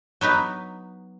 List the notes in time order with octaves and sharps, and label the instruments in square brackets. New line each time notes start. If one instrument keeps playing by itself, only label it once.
[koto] F#3 B3 D#4 B4